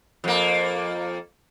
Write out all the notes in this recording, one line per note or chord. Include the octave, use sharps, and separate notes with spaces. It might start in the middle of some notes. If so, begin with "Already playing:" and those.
F2 A#3